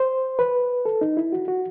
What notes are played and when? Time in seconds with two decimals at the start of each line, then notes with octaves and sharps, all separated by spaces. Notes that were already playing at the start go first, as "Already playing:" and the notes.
Already playing: C5
0.39 B4
0.86 A4
1.01 D#4
1.17 E4
1.33 F#4
1.48 F#4